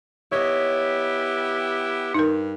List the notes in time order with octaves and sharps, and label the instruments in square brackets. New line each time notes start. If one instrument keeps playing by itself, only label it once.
[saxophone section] B3 E4 G4 [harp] C#5 D#5
[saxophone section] G2 [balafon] D#4 A#4